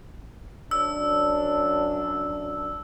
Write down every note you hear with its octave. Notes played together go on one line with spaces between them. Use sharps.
F#2 D4 E6